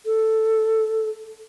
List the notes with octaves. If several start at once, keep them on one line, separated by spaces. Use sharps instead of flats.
A4